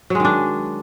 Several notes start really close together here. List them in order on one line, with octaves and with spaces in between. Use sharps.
F#3 G#3 D#3 D4